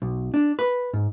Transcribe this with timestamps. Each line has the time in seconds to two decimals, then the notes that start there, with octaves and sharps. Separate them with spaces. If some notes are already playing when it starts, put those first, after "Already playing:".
0.02 B1
0.34 D4
0.59 B4
0.93 G#2